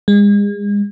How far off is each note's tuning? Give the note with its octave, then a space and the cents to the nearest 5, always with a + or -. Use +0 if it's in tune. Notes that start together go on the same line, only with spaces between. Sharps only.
G#3 -35